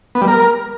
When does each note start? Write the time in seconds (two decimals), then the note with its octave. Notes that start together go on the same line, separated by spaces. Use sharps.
0.15 B3
0.21 G3
0.28 A#4